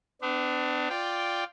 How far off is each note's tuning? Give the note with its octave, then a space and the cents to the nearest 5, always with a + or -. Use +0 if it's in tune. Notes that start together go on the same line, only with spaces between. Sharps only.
B3 +45 D4 +15
F4 +0 D5 +0 G5 +0